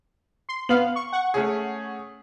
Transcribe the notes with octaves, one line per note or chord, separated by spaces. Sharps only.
C6
B3 F5 F#7
C#6
F#5 C#6
A3 C#4 G#4